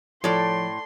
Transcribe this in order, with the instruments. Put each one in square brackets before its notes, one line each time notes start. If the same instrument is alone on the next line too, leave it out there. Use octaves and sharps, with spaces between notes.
[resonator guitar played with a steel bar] A2 [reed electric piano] F3 C#5 [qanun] A4 D5 [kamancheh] C6